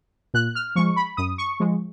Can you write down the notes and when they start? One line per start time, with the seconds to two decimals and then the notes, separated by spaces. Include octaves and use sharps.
0.34 A#2 F#6
0.55 F6
0.76 F3 G#3 C#6
0.96 B5
1.17 F#2 D#6
1.38 C#6
1.60 F3 G#3